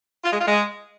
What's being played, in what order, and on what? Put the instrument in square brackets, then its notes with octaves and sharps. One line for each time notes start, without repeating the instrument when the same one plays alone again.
[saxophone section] F4
G#3
F4
G#3